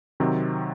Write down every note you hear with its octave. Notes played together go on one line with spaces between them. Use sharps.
C3 D#3 F#3 C4